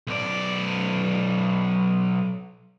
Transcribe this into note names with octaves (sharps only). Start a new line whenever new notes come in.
B1 D5